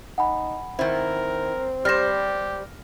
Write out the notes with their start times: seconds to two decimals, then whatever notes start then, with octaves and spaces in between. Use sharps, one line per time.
0.18 D#4 F#5 G#5 B5
0.79 D#3 C4 E4 A#4
1.85 G3 G4 C5 F6 A#6 E7